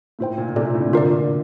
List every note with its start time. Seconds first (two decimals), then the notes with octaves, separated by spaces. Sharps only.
0.19 A2 A#3 F4 C5 G5
0.38 A#2
0.49 A#2
0.56 C3 C4 F4 A4 D5
0.66 A#2
0.75 A2
0.80 D3
0.84 C3
0.93 D3 F4 A#4 D5